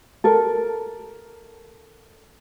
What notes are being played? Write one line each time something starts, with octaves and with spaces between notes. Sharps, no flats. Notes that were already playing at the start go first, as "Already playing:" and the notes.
A4 A#4